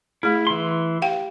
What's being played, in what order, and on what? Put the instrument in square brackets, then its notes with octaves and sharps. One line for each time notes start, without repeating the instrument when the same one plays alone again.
[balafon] A3 G#4 [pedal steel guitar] E4
[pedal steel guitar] E3 C6
[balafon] G4 F5 G5